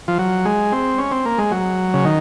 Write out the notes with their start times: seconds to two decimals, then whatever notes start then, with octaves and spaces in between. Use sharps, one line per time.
0.08 F3
0.19 F#3
0.45 G#3
0.72 C4
0.98 C#4
1.11 C4
1.25 A#3
1.38 G#3
1.52 F#3
1.94 C#3
2.05 D#3